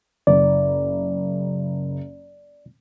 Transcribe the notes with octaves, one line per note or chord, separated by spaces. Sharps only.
F#1 D5